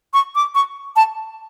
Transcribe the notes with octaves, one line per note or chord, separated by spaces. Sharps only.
C#6
D6
C#6
A5